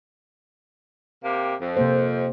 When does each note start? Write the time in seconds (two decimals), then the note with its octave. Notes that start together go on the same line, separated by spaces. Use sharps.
1.23 C3 A#3 G4
1.61 F2
1.77 C3 A#3 C5